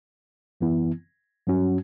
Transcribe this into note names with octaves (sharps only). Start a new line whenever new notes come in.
F#2 E3 B3 E4
G2 F#3 C#4 F#4